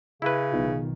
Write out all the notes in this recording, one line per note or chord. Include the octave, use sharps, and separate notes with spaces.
C#3 E4 B4
B1 D#3 B3 D#4 F4